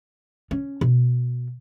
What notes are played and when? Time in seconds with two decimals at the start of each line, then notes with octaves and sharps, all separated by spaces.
0.51 C#4
0.81 B2